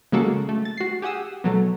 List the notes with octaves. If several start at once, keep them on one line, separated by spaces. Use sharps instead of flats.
C#3 G#3 A#3 F#4 A4
A3
A6
F#4 C7
G4 G#4 F#5 D#6 E6
B2 F#3 A3